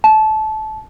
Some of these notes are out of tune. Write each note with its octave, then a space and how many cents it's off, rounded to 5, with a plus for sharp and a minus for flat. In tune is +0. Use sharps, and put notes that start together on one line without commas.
A5 -20